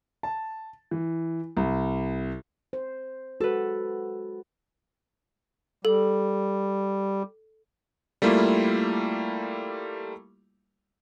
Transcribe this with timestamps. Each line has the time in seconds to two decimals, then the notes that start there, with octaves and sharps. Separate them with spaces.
0.23 A5
0.91 E3
1.57 C2
2.73 C5
3.41 G#3 F#4 A4 B4
5.85 G3 A4
8.22 G3 A3 A#3 E4 F4